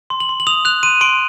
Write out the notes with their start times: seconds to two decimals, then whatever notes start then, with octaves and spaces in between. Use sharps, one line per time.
0.10 C6
0.20 F#7
0.29 C6
0.40 F#7
0.47 D#6 F7
0.65 F#6 F7
0.83 C6 D#7
1.01 C6 D7